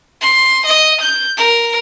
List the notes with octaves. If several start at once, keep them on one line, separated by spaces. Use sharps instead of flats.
C6
D#5
G6
A#4